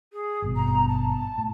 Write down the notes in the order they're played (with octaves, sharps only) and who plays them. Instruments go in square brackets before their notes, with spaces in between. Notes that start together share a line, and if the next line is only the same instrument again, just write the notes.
[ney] G#4
[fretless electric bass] G#1 G2 B2
[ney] A#5
A5
[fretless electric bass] A2